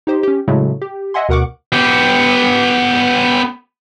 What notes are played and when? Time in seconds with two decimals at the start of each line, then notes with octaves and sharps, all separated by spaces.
0.07 D#4 G4 C5
0.23 C#4 G4
0.48 A2 C#3 F#3 G#3 A3
0.82 G4
1.14 D#5 E5 F#5 G#5 C6
1.29 D2 B2 A#4 F#5 C#6 D6
1.73 B3 G4